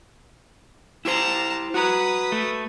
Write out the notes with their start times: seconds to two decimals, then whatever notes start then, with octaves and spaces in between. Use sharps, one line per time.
1.05 E4 G4 C5 A5 A#5
1.74 F#4 B4 A#5 D#6
2.32 A3